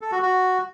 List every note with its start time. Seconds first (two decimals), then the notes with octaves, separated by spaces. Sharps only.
0.01 A4
0.12 F#4
0.22 F#4